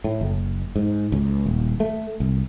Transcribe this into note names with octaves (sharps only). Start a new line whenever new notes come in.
A2
F#1
G#2
C#2
D#1
A3
C2